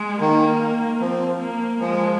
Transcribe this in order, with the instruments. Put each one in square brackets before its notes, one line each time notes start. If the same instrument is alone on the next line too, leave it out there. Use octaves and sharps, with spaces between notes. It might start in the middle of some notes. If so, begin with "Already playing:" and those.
Already playing: [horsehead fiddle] G#3
[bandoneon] D#3 [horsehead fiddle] A#3
[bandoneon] F3 [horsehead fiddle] C4
[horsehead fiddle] A#3
[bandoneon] F3 [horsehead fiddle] G#3